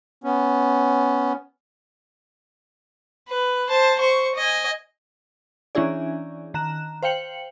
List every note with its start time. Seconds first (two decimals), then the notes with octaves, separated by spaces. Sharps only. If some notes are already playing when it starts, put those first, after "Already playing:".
0.24 B3 C#4
3.29 B4
3.69 C5 A5
3.99 C5 C#6
4.35 D#5 G#5
5.75 E3 C#4 D4 E4 G#4 D5
6.54 D#3 A#5 F#6 E7
7.03 C5 F5 G5 C#7 F#7